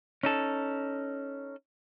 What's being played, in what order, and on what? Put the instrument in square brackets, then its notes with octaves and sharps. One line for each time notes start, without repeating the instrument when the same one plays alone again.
[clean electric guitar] C#4 D#4 A4